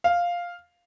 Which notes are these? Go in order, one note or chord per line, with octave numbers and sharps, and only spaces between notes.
F5